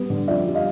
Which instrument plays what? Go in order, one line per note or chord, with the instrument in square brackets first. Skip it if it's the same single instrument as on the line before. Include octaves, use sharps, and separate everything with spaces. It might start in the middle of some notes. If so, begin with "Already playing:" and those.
Already playing: [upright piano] G3 B3
D3
F2 D5 E5
G3
D#5 F5